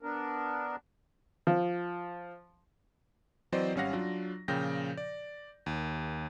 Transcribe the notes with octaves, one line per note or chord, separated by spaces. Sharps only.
B3 D4 A#4
F3
E3 F#3 C4 C5 D5 D#5
G#1 G3 C#4 F5 F#5 A#6
F#3 D4 F4
A#2 C#3 F3 G5 G6 A#6
D5
D#2